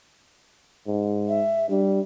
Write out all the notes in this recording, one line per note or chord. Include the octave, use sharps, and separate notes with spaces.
G#2
E5
G3 D4